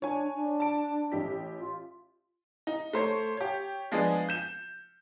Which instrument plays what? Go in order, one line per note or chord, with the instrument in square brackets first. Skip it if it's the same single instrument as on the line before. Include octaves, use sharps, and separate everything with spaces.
[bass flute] D4 [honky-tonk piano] C#5 G#5
[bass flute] D4
[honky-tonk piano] A5 D7
A1 G4 B6
[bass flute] F4
[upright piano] D#4
A3 C5 C#5
G4 C#5
F3 G#3 B3 D4 G#4
G6 E7